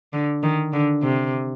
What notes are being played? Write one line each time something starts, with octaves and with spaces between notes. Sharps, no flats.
D3
D#3
D3
C3